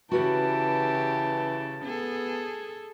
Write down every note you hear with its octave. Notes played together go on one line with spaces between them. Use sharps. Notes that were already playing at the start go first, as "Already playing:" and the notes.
C#3 E3 F#4 G4 B4 F#5 A5
B3 G#4 A4